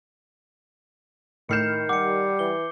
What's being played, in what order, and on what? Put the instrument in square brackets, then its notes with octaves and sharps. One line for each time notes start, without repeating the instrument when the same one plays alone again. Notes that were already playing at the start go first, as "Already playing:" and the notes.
[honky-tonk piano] A2 F6 E7 [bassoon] D#3 [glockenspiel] G6 C7 C#7
[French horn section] G3 [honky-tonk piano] F#5 [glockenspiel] D6 C#7
[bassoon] E3 [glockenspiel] G7